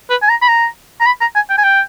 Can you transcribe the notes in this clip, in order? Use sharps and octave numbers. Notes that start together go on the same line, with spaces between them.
B4
G#5
A#5
B5
A#5
A#5
B5
A#5
G#5
G5
G#5
G5